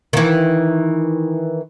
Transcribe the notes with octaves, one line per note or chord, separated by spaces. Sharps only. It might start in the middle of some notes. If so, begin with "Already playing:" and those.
D#3 E3